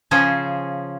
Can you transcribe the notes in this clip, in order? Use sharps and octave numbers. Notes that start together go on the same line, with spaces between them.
C#3 F3 C#4 G#4 C5